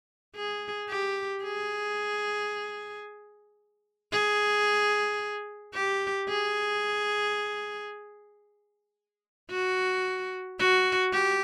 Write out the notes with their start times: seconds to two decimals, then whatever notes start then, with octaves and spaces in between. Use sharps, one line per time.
0.36 G#4
0.89 G4
1.44 G#4
4.12 G#4
5.74 G4
6.29 G#4
9.51 F#4
10.59 F#4
11.12 G4